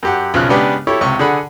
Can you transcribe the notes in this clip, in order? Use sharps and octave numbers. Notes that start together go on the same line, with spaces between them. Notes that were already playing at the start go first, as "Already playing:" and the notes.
F#2 G4 F#5
B1 C#3 F3 F6 F#6
C#3 G#3 B3 D4 G4 B4
E4 G4 A4 C#5
C#2 C3 C#6
D3 G#4 D5 F#5 B5